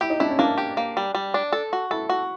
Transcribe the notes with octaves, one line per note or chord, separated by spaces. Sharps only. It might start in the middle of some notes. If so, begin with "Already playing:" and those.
E4 G4
D#4
D4 E4
C#4
A#3 D4
G4
A#3
G3
G3
D4
A4
F#4
E4 A4
F#4